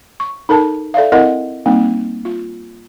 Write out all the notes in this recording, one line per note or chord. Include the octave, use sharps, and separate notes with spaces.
C#6
D#4 A4 A#4 A5
A4 D5 E5 F5
C4 E4 A#4 D#5 F#5
G3 A#3 C4 D#4
F4